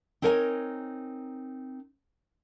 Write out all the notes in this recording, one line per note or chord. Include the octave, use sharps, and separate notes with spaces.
C4 D#4 A#4 C#5 D#5 G#5